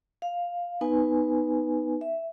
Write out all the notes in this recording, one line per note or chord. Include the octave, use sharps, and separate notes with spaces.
F5
B3 D#4 B4 G#5
E5